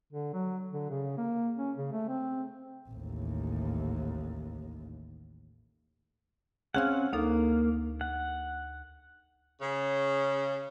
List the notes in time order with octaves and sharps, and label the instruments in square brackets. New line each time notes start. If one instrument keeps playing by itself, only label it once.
[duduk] D3
F#3
D3
C#3
A#3
C#4
C#3
A3
C4
[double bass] A1 D#2
[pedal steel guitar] C4 C#4 F#5 [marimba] G#4 F5 F6
[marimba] D2 D#4 A4 [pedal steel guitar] A#3
[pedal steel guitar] F#5
[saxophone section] C#3